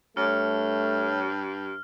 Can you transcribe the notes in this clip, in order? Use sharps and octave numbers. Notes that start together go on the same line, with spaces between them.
G2 A3 C#5 F6